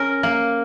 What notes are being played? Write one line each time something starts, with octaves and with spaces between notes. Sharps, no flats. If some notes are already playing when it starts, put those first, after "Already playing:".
Already playing: C#4 A#4
A#3